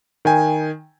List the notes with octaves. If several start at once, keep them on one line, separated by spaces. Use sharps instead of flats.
D#3 G5 G#5